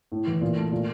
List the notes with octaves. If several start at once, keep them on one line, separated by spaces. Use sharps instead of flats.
A2
E3
A#2
A3
A#2